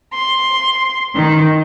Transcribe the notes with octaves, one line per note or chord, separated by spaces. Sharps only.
C6
D#3